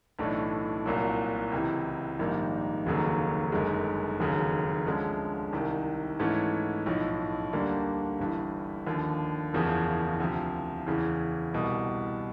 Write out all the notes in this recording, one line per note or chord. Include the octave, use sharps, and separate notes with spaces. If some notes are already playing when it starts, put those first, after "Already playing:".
B1 A2 E3 A3 D4
C2 A#2 F#3
C#2 C3 E3
A#1 G#2 D#3 G3 A#3
F1 D#2 C#3 F#3 A#3
G1 F#2 D#3 G#3
F1 D#2 C#3 F#3
D2 D3 F3 G#3 C#4
C2 C3 D#3
G#2 E3 A3 C#4
B1 A2 F3
D2 D3 G3 A#3 D4
G1 G2 E3
D#2 D3 F3
F#1 E2 C#3 F3
D2 C3 F3
E2 C#3 E3
C2 B2 G3